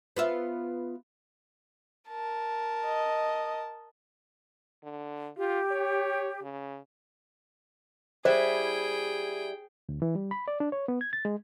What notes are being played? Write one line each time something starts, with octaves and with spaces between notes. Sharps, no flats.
B3 F4 E5
A#4 A5
D#5
D3
F4 G4
C#5
C#3
G3 E4 G#4 C5 E5 G5
D2
E3
G3
B5
D5
D4
C#5
B3
G#6
A6
G#3